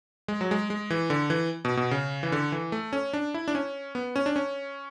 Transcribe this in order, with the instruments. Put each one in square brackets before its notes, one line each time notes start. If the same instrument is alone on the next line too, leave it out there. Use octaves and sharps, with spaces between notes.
[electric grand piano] G#3
F#3
G#3
G#3
E3
D3
E3
B2
B2
C#3
E3
D3
E3
A3
C#4
D4
E4
D4
C#4
B3
C#4
D4
C#4